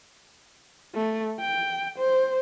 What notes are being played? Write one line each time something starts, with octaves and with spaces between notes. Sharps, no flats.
A3
G5
C5